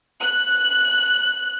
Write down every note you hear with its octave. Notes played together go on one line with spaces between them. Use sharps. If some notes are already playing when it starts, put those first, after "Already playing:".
F#6